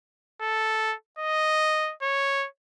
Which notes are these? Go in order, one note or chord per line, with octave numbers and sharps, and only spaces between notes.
A4
D#5
C#5